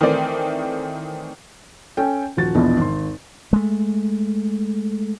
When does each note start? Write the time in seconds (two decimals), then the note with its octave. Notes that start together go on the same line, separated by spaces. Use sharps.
0.01 D#3 E3 A3 C4 D5
1.97 C#4 A4 G5
2.37 D#1 F3 F#4 A6
2.55 A#1 E2 B2 F3
2.77 G#1 C6
3.53 G#3 A3